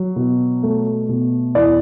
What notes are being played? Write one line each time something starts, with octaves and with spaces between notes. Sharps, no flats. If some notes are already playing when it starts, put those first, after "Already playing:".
Already playing: F#3
B2
A3
B2
E2 D5